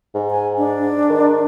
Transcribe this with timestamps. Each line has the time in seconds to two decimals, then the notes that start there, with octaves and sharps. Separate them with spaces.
0.15 G#2
0.30 G#5
0.58 D4
1.10 D#3